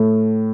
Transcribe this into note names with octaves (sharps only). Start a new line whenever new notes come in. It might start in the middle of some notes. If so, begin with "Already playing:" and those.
Already playing: A2